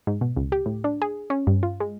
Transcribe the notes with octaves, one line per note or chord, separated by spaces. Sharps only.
G#2
B2
C#2
G4
A2
D4
G#4
C#4
G2
F4
G#3